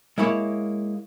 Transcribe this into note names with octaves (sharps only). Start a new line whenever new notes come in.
G#3 A#3 E4 C#5